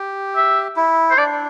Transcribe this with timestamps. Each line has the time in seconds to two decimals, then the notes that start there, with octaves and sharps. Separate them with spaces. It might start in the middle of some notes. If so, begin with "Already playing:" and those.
Already playing: G4
0.35 E5
0.76 E4
1.11 C5
1.17 D4 D5